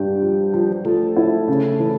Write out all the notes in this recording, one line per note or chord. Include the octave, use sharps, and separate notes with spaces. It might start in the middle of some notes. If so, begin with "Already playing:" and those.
Already playing: G2 G3 G4
F3
F3
F3 A3 A4
E4
C#3
E3